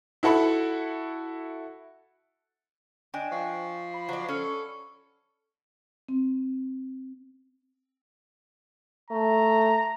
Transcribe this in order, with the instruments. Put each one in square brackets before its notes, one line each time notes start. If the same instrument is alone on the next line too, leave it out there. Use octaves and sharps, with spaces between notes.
[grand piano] E4 F#4 A4 B5
[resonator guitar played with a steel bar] D4 [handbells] D#5 G5 G#5
[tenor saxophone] F3 [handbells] C#6
[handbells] B5
[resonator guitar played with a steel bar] F#3 D5
[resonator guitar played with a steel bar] C#4 [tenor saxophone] A4
[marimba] C4
[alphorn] A3 [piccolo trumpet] A#5